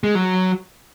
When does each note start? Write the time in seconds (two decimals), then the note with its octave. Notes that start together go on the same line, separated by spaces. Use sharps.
0.04 G#3
0.15 F#3